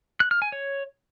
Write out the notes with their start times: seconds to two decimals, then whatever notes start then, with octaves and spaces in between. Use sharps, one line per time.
0.20 F#6
0.31 F6
0.42 G#5
0.52 C#5